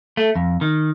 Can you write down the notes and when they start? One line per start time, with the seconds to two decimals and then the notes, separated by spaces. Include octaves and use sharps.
0.17 A3
0.36 F2
0.61 D#3